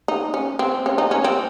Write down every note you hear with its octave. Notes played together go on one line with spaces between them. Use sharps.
D#4
C#4
C4
C#4
D#4
C#4
C4